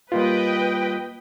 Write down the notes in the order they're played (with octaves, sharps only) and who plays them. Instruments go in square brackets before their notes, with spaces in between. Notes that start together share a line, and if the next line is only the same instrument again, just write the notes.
[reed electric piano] G3 A#3 F4 [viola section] B4 D#5 G5